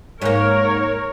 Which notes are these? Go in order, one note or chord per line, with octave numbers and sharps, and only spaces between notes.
G#2 A#3 A#4 C#5